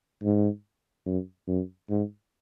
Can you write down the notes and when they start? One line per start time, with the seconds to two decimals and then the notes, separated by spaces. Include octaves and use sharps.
0.23 G#2
1.06 F#2
1.48 F#2
1.90 G#2